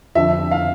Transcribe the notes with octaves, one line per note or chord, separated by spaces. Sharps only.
F2 D3 F3 E5
F5